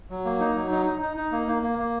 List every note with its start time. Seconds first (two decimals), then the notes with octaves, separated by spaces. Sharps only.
0.10 F#3
0.25 A#3
0.40 D#4
0.55 F#3
0.71 D#4
0.86 D#4
1.02 D#4
1.17 D#4
1.32 A#3
1.48 A#3
1.63 A#3
1.78 A#3